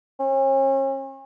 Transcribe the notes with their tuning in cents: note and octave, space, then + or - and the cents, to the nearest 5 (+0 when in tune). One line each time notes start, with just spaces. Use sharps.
C#4 -40